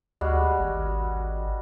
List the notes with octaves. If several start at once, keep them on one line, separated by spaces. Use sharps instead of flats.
D2 G3 G#3 F#4
G#1